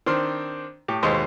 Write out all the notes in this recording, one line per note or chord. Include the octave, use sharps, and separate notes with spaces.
D#3 C4 D4 C5 C6 F6
A2 G4
D#2 B2 G#3 C5 D#5 C#6